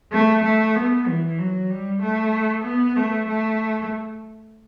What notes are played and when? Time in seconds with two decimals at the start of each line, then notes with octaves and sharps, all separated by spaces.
0.12 A3
0.43 A3
0.75 B3
1.07 E3
1.38 F#3
1.70 G3
2.02 A3
2.64 B3
2.96 A3
3.28 A3